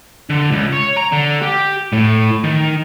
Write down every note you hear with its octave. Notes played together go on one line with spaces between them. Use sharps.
D3
C#2
C#5
A#5
D3
G4
A2
D#3